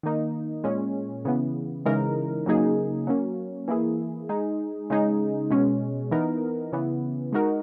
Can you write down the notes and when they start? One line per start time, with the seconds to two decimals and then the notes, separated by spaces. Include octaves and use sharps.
0.03 D#3 A#3 D#4
0.64 A#2 G#3 C#4
1.25 C#3 E3 B3
1.85 C#3 E3 G#3 D#4 A#4
2.46 C#3 F#3 A#3 D#4 G#4
3.07 F#3 A#3 C#4
3.68 E3 A#3 E4 G#4
4.29 G#3 D#4 G#4
4.90 C#3 G#3 D#4 G#4
5.50 B2 G#3 C#4
6.11 E3 B3 D#4 A#4
6.72 C#3 E3 B3
7.32 G#3 D#4 F#4 A#4